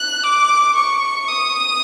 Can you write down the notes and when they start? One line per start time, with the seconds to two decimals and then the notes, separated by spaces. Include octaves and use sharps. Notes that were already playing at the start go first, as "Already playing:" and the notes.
Already playing: F#6
0.23 D6
0.75 C#6
1.28 D#6